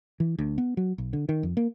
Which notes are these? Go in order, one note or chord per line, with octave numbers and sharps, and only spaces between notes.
E3
D2
B3
F#3
B1
D3
D#3
F2
A#3